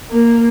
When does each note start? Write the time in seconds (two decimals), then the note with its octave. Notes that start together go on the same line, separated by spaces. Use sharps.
0.11 A#3